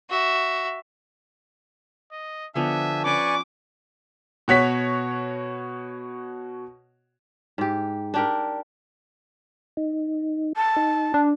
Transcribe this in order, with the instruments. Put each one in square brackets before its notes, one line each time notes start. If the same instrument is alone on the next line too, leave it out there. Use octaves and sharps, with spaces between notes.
[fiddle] F#4 E5
[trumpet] D#5
[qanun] D3 F3 B3 [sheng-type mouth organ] D4 G#5 [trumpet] E5
[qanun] C#4 [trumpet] B4 [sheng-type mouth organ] D5 G#5 C#6 [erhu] D6
[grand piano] B2 F#4 C#5 B6
[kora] G#2 G4
D4 G4 A#4
[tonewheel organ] D#4
[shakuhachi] A5
[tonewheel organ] D#4
[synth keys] D4